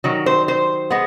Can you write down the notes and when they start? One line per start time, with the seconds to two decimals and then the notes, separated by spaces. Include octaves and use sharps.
0.04 D#3 F#3
0.26 C5
0.48 C5
0.90 G#3 B3